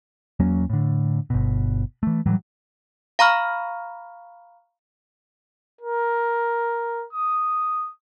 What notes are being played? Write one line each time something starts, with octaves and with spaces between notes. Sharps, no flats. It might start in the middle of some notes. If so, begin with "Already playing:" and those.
E2 F#3 A#3 C#4
A2 D3
G1 B2
E3 A3
A2 E3 F#3 G3
F5 A#5 B5 C#6 F6
A#4
D#6